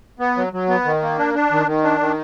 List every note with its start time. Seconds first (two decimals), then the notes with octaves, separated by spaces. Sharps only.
0.19 B3
0.37 F#3
0.53 F#3
0.69 B3
0.85 D#3
1.02 A#3
1.18 D4
1.34 D4
1.51 D#3
1.67 D#3
1.84 D4
2.00 D#3